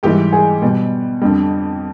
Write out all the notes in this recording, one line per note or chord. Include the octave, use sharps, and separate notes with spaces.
G#2 E3 G3 G4
G#4
B2 G3
F2 D3 G3